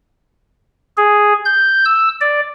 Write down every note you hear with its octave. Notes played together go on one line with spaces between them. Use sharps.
G#4
G6
E6
D5